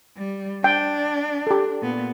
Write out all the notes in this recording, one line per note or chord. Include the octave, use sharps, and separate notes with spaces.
G3
D4 G5
G4 A4
A#2 B3